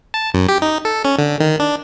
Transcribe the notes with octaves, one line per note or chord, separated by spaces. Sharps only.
A5
F#2
G4
D#4
A4
C#4
D3
D#3
D4